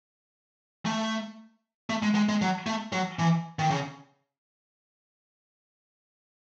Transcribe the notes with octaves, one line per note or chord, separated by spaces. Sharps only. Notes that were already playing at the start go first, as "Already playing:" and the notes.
A3
A3
G#3
G#3
G#3
F#3
A3
F#3
E3
D#3
C#3